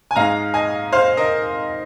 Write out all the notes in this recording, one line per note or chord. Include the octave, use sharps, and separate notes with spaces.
G#5
G#2 G#3 D#4 F5 A#5
D#5 G#5
C5 F5
A#4 D#5